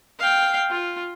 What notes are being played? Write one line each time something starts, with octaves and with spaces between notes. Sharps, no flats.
F5 G5
F4